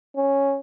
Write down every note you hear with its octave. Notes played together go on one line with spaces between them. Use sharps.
C#4